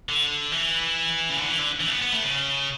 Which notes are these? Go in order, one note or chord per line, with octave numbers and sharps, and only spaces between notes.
D3
E3
C#3
D3
E3
D3
E3
A3
B3
B3
A3
C#3